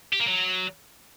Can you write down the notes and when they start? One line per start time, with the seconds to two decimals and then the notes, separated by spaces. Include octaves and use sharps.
0.13 G4
0.20 A#3
0.27 F#3